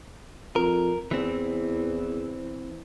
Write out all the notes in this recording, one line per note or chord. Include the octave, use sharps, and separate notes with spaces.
F2 A#4
E2 E3 C4